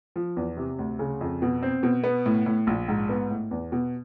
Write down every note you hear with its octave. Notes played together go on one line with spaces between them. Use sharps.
F3
E2
C3
D2
C#3
F2
B2
C4
B2
B3
A2
A2
A#1
G#2
B3
A2
E2
B2